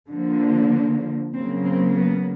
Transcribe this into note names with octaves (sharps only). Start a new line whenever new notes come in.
D3 F3 A#3
C#3 F#3 A#3 C4
C4
B3